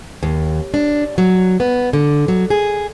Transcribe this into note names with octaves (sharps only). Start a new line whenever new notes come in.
D#2
D4
F#3
B3
D3
F#3
G#4